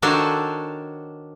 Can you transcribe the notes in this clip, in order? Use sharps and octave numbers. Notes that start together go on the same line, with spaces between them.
D#3 D4 F#4 A4 C5 C#5